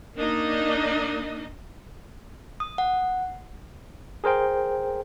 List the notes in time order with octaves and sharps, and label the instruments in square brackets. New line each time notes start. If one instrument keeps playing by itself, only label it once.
[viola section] A#3 D4 D#4 D#5
[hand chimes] D#6
F#5
[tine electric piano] G#4 A#4 C5 G5